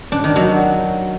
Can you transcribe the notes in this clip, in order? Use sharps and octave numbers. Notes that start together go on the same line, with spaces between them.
D4
D#3
F#3